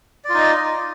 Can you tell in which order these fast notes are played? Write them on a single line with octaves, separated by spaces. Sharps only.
D5 F4 D#4 D#5